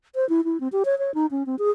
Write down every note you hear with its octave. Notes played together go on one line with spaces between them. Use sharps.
C5
E4
E4
C4
G4
C#5
C#5
D#4
C#4
C4
G#4